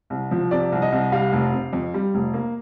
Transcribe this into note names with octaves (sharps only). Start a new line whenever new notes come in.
C2
F3
C3 D5
C2
D#5
C2
G3 F5
F1
C3
F2
G3
F1
A#3